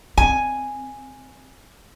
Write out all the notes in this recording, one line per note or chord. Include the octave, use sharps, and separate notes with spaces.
C4 G#5